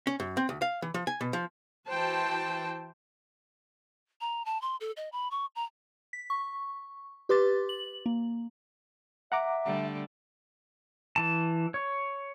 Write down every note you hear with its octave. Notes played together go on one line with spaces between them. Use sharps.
C#4
F#2
C4
D2
F5
E3
F3
G#5
B2
F3
E3 F#4 C5 G5 A5
A#5
A5
C6
A4
D#5
B5
C#6
A#5
B6
C#6
G4 B4 C6 D6 A6
F#7
A#3
E5 F#5 A#5 D6
D3 G3 A3
E3 A5
C#5